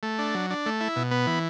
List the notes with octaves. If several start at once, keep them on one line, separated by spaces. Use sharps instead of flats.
A3
D4
F#3
D4
A3
E4
B2
B3
E3